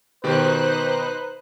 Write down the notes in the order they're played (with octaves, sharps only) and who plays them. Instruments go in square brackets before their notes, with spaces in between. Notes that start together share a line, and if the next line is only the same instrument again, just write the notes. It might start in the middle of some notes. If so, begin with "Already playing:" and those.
[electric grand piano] B2 D#3 G4 [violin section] D#4 C5 F#6 [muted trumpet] B4